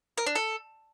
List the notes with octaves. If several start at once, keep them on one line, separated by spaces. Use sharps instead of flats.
A#4
D4
A4